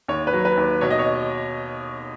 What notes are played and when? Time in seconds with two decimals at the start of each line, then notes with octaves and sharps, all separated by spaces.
0.08 D#2 C#5
0.27 B4
0.33 F#3
0.45 B4
0.57 D#2
0.81 B2 C#5
0.91 D#5
0.99 C#5